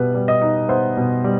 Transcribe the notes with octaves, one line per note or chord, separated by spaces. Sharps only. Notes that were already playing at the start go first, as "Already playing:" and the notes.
Already playing: B2 G3 B3 B4
G3
D#5
D#4
B3 C5
B2
G3